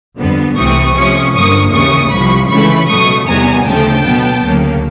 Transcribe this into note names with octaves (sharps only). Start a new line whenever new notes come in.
F2 D3 G3 B3
C2 C3 E3 A3 C4 C#6 D#6
C3 F3 A3 C#4 C#6 D#6
G2 D3 F3 A#3 C#6 D#6
D#2 C#3 E3 C#6 D#6
C2 C3 F3 B5 C#6
C#2 C#3 E3 A3 B5 C#6
C#2 B2 F#3 A3 C#6 D#6
E2 C3 D#3 G3 B3 G#5 A#5
D2 C#3 F3 A3 G5 A5
B2 F#3 B3
D2 C#3 F#3 A#3